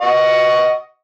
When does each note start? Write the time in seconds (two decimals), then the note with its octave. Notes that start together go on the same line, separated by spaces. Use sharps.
0.01 D#5 F#5 C#6